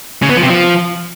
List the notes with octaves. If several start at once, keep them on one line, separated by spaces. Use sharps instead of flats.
C#3
B3
F3
C3
F3